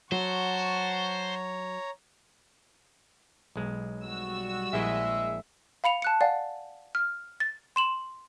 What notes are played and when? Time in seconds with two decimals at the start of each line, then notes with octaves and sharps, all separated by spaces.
0.12 F#3 C5 C#5 F#5 A5 A#5 C#6
3.56 B1 G#3
4.02 G3 F#4 E6
4.73 A#1 G#3 E4 D#5 E5
5.84 F5 B5 C#7 F7
6.02 A5 F#6 C#7
6.21 D5 F5 F#5 G#5
6.95 F6
7.40 A6
7.76 C6 E7 F#7